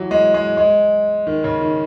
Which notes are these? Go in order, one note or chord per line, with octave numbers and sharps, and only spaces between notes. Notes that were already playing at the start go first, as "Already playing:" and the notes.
Already playing: E3 F#3
G#3
G#3
G#3
D#3
C#3
D#3